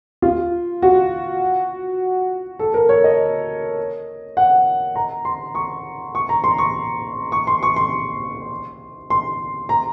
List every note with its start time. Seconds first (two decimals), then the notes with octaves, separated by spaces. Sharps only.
0.22 F4
0.82 F#4
2.59 A4
2.74 A#4
2.89 C#5
3.04 D#5
4.37 F#5
4.95 A#5
5.25 C6
5.55 C#6
6.15 C#6
6.29 A#5
6.44 C6
6.58 C#6
7.32 C#6
7.47 C6
7.63 C#6
7.76 C6
9.10 C6
9.69 A#5